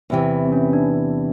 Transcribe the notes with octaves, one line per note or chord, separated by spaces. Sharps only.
E2 C3 E3
C4
C#4
D4